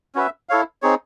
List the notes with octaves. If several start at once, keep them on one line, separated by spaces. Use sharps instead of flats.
C#4 F#4 B4 E5
E4 A4 C#5 F5
C4 D#4 G#4 C#5